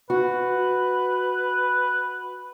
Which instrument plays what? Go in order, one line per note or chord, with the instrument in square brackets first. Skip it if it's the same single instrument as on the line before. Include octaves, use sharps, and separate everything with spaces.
[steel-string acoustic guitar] F#4 [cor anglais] B4